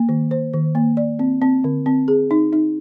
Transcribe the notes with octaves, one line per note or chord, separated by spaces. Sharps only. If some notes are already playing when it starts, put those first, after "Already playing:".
Already playing: A#3
D#3
C5
D#3
A#3
D5
C4
C4
D3
C4
G#4
D#4
D#4